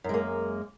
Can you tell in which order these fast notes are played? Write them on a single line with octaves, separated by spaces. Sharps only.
F#2 G#3 A#3